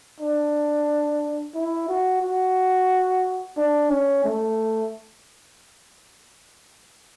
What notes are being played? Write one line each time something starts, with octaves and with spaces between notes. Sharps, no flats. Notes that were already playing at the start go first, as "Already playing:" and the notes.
D4
E4
F#4
F#4
D4
C#4
A3